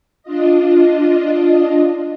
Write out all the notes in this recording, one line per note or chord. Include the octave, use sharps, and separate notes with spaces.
D4 F4 D#5